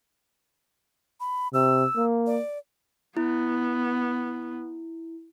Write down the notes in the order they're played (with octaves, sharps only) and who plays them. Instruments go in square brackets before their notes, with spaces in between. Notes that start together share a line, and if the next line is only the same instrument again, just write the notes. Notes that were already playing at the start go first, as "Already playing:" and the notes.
[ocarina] B5
[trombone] C3 [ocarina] E6
[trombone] A#3
[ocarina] D5
[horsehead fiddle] B3 [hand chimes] E4